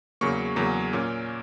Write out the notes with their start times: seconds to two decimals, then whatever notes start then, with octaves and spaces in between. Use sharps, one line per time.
0.21 E2 C#3 F#3 A#3 C#6
0.56 E2 C#3 F#3 A#3
0.93 A#2 A#3 C#4